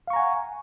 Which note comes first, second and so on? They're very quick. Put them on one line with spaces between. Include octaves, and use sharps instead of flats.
F5 C#6 A#5 G#5 F#5